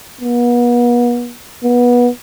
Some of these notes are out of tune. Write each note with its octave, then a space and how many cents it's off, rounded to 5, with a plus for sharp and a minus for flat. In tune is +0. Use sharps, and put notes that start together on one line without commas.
B3 -40
B3 -20